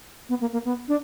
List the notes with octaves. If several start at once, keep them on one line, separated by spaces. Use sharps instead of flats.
B3
A#3
A#3
B3
D4